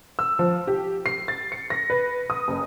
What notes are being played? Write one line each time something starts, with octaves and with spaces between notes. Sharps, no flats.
E6
F3
G4
C7
A6
C#7
A#6
B4
D#6
F#1